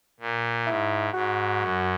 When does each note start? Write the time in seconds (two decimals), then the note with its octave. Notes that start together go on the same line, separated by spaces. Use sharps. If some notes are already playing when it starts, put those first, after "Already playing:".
0.20 A#2
0.66 G#2 E4
1.14 G#2 F#4
1.60 F#2